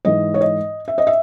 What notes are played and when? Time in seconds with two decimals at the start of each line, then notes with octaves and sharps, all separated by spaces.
0.05 G#2 E3 D#5
0.34 C#5
0.41 D#5
0.88 E5
0.98 D#5
1.07 E5